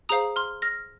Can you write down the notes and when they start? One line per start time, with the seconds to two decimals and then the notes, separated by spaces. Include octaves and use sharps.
0.09 G#4 C5 F5 A#5 D#6
0.36 C6 F6
0.62 F6 A#6